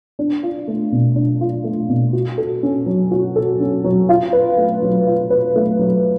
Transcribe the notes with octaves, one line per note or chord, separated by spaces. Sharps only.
D4
F4
A3
B2
D4
F4
A3
B2
F#4
A4
C#4
F#3
F#4
A4
C#4
F#3
F4
B4
A3
F#3
F4
B4
A3
F#3